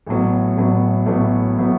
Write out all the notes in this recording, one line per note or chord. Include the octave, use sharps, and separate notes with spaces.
A1 A2 F#3 B3
A1 A2 F#3 B3
A1 A2 F#3 B3
A2 F#3 B3